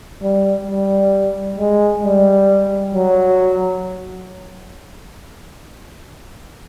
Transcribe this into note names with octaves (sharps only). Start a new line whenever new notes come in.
G3
G3
G#3
G3
F#3